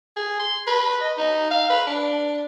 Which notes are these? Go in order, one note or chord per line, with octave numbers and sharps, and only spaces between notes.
G#4
C6
B4
D#5
D#4
F5
B4
D4